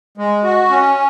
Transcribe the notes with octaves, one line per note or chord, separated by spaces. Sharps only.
G#3
F#4
C#4